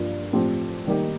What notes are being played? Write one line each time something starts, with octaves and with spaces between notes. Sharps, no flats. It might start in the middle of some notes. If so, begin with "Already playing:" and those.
Already playing: G2 F3 A#3 D4 F4
A2 F3 C4 G4 C5
D#3 G3 A#3 D#4 G4